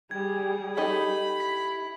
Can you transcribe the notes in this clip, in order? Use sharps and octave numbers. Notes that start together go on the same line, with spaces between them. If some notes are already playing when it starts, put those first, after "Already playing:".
G3 G#4 G#6
D#4 G4 A4 B5
E4 B6